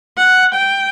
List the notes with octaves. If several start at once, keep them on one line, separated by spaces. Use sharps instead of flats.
F#5
G5